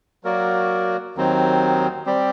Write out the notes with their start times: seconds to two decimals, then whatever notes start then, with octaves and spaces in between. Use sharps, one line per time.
0.24 F#3 A#3 F#4 A#4 D5
1.15 D#2 D#3 F#3 C4 D#4
2.06 G3 C4 G4 D5